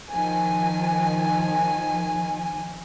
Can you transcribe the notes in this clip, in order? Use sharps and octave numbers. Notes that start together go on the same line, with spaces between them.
D#3 F3 G#5